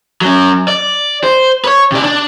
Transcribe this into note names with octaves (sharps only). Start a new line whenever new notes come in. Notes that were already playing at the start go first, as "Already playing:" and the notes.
F#3 C#4
D5
C5
B4 C#5
C3 D5
D4